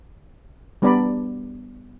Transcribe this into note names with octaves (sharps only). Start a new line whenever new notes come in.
G3 B3 D4 D5 A#5 B5